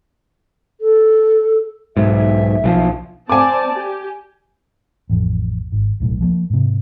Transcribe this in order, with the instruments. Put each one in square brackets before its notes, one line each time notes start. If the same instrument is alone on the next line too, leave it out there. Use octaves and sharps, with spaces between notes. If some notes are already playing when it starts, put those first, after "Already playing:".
[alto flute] A4
[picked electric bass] B1 G#2 [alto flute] E5
[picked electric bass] B1 E3 F3
[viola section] C4 D5 A5 [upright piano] G#5 D6
[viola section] G4
[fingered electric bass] A1 F2
G#1
D1 B1 A2
F3 G3 A#3
G#2 C3